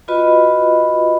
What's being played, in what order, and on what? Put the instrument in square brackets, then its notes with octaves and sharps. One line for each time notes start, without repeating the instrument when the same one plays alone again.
[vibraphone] F4 F#4 B4 D#5 B5